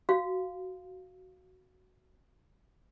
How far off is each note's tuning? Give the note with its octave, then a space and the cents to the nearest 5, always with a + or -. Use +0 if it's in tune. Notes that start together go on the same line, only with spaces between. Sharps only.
F#4 +0 F5 +0